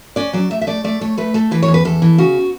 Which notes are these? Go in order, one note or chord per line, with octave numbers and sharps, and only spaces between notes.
C#4 D5
F#3 D5
A3 E5
E5
A3 D5
A3 D5
A3 C#5
A3 B4
A3 A4
E3 B4
C#5
E2
B4
E2 A4
E3
C#3 F#4